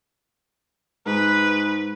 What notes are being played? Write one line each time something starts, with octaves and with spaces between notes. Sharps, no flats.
G#2 B4